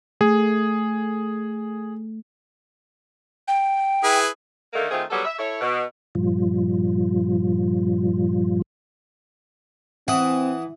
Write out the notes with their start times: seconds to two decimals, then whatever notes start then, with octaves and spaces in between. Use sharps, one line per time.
0.21 A3 G#4
3.48 G5
4.04 E4 G#4 B4
4.73 D3 D#3 A3 A#3
4.91 D#3 A3 C4 F4 G#4
5.11 F#3 G3 B3 G#4 A4
5.25 E5
5.39 E4 A4 C#5
5.61 B2
6.15 G2 A#2 F3 G3 F4
10.08 E3 C4 F#5 D#6